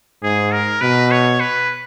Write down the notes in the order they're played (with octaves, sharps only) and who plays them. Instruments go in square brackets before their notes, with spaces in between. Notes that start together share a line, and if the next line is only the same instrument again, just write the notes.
[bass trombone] G#2 [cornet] G#4
[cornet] A#4
[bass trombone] B2 [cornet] B4
[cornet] C#5
B4